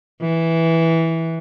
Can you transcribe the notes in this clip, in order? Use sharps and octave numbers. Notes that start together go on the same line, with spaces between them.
E3